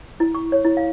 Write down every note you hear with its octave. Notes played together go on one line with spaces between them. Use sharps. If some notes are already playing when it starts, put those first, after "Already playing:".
E4
C#6
C#5
E4
F5